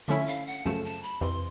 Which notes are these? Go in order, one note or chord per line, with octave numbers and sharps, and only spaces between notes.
D3 F3 A3 C#4 E4 E5
F5
F#5
F#2 C#3 F3 A3 A5
A5
B5
F2 C3 E3 C6